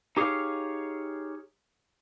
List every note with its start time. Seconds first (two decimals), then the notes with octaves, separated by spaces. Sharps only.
0.17 D#4 G4 G#4 C5 C#5 F5